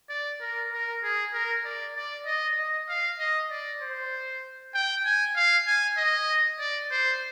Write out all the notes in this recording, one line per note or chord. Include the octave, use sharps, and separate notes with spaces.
D5
A#4
A#4
G#4
A#4
D5
D5
D#5
D#5
F5
D#5
D5
C5
G5
G#5
F5
G#5
D#5
D5
C5